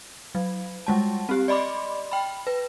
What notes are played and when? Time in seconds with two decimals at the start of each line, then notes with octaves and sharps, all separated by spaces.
0.35 F#3
0.87 G3 G#3 A5
1.29 C4 G4
1.48 D5 D#5 B5 C6 D6
2.11 G5 B5
2.47 B4